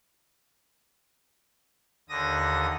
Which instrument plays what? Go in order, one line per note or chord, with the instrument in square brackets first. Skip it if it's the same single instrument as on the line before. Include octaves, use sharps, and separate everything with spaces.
[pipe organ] D#2 D3 D#6 A#6